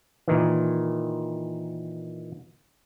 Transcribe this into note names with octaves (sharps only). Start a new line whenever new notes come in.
A#2 D#3 E3